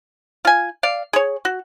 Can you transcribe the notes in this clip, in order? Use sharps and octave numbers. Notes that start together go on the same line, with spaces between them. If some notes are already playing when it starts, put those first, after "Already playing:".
F4 G#5
D5 F5
G#4 C#5
F#4